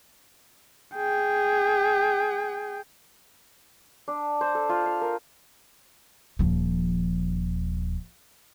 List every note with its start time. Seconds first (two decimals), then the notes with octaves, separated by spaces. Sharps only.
0.95 G#4 G5
4.08 D4
4.41 C5
4.55 A4
4.69 F4
4.86 F5
5.01 A#4
6.39 D#1 F3